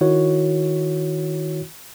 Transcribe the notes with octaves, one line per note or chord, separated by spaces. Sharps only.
D#3 E4 F#4 C#5